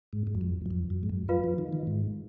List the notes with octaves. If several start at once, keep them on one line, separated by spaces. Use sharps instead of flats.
G#2
G#2
F#2
F2
F#2
F2
F#2
G#2
F#2
F#2 F4 B4 F5
F3
D#3
D#3
G#2